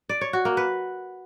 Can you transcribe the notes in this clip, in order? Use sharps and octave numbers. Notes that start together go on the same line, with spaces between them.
D5
C#5
F#4
A#3
B4